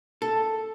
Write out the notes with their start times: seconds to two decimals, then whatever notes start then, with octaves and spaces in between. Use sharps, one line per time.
0.22 A4